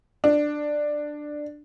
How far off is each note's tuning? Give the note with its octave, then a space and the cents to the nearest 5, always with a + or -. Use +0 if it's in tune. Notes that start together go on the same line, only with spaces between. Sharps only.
D4 +10